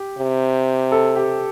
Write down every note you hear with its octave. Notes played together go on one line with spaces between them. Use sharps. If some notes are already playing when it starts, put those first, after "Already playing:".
Already playing: G4
C3
A4
G4